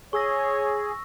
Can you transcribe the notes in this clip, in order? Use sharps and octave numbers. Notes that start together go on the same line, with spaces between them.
G#4 C#5 C#6 E6 A#6